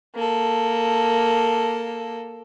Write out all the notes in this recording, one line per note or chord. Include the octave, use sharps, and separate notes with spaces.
A#3 A4